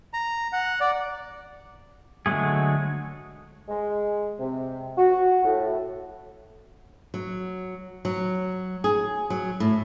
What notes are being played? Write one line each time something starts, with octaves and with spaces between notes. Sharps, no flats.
A#5
F#5
D5
D3 F#3 G#3 A3 G#4
G#3
C3
F#4
A2
F#3
F#3
G#4
F#3
A2